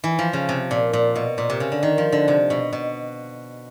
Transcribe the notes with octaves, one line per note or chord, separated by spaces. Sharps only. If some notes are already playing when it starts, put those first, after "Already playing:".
E3
F3
C#3
C3
A#2
A#2
B2
A#2
C3
C#3
D3
D#3
F3
D3
C3
B2
B2